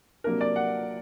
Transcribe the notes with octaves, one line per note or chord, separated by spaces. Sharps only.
C3 F#3 A#3 D4 A#4
D5
F#5